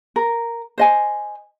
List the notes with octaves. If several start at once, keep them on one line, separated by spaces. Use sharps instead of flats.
A#4
C5 D#5 G#5